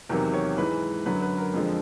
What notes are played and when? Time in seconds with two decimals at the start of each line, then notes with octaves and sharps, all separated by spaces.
0.09 E2 C3 D#3 F#3 A#4
0.34 C#5
0.58 G#2 E3 G#3 B4
1.06 F#2 D3 F#3 B4
1.22 B4
1.38 A#4
1.54 F2 D3 F3 G#3